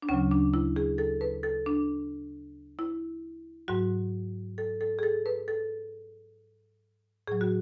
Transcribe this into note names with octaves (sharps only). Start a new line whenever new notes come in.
D4
D2 C#3 F#3 C#4
D4
E4
G#4
A4
B4
A4
D4
E4
G#2 F#3 F#4
A4
A4
G#4
A4
B4
A4
A2 F#3 G#4
F#4